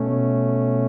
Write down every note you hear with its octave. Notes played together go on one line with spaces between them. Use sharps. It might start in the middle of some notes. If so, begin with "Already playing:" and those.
Already playing: B2 A3 C#4